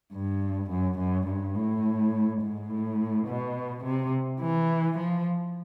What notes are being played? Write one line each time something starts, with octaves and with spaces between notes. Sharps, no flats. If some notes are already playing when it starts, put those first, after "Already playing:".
G2
F#2
F#2
G2
A2
G#2
A2
B2
C3
E3
F3